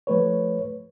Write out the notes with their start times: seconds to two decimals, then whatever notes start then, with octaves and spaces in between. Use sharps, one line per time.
0.07 F3 A3 B4 C#5